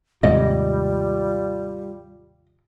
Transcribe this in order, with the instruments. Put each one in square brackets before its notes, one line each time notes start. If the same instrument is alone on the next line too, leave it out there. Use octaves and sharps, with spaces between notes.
[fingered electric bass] D#2 G#2 C3 [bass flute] G3 [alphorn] F4 [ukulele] D#5